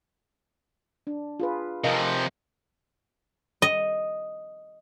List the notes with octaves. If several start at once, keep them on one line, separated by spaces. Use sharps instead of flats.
D4
F4 G#4 B4
C3 F3 A#4 D#5 F5
D#5